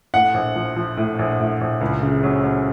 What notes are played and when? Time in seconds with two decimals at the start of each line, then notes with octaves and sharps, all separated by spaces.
0.14 A2 F#5
0.34 A#1
0.56 F3
0.76 F3
0.97 A2
1.19 A#1
1.40 A2
1.61 A#1
1.81 C#2
2.02 C#3
2.23 F#3
2.44 F#3